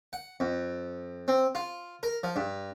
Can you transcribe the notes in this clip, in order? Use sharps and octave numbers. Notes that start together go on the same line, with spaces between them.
F#5
F2
C4
F4
A#4
F3
G2